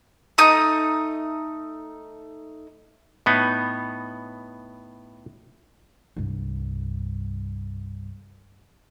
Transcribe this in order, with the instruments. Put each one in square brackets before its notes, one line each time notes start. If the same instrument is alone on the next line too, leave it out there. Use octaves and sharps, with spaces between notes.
[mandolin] A3 D#4 D#6 G6
[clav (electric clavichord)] A2 B3 D#4
[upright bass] C2 G2